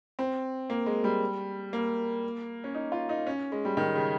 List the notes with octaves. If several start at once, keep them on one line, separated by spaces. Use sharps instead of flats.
C4
A#3
G#3
G3
A#3
C#4
D#4
F4
D#4
C#4
G#3
G3
D#3
C#3